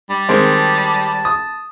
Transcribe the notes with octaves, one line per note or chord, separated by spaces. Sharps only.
G3
D#3 G#3 C4 A5
D#6